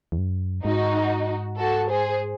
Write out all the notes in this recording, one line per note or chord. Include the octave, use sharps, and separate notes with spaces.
E2
F#2
G#2 D#4 F#4
F#4 A4
G#4 C5